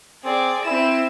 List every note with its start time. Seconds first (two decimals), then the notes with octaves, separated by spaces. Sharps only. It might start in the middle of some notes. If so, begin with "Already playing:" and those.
0.24 C4 G#4 D5
0.66 C4 E4 E7